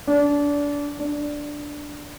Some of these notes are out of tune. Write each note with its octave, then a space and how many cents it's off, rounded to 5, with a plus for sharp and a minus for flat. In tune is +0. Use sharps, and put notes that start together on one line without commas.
D4 -25
D4 +0